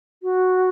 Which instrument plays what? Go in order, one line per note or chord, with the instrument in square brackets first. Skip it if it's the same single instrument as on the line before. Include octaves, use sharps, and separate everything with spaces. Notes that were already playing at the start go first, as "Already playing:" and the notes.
[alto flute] F#4